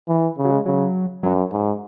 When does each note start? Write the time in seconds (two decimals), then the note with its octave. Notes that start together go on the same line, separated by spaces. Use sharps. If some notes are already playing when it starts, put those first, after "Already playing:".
0.08 E3
0.38 C#3
0.45 F#3
0.51 G#3
0.66 C#3 F#3
1.23 F#2 F#3
1.52 G#2